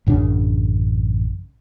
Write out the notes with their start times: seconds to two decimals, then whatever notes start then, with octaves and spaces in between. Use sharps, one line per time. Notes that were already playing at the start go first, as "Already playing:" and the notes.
0.07 A1 F#2 C#3 D4